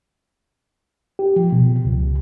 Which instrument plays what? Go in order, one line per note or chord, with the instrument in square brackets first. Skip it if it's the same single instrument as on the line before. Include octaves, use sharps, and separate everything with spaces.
[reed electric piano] G4
F3
B2
C#2